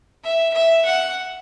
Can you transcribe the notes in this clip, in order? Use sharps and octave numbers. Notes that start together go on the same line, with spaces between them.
E5
E5
F#5